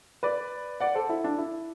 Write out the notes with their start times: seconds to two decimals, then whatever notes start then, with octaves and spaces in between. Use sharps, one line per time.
0.23 B4 D5
0.80 D5 F#5
0.94 A4 C5
1.09 E4
1.24 D4
1.38 E4